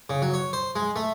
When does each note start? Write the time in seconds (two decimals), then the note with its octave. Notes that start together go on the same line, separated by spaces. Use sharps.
0.10 C#3
0.22 F#3
0.34 C#5
0.53 C5
0.76 G#3
0.96 A3